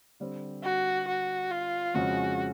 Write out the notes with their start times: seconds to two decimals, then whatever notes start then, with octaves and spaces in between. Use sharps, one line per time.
0.20 D3 G3 C4
0.63 F#4
1.08 F#4
1.51 F4
1.94 F2 C#3 F3 G#3 C#4 F#4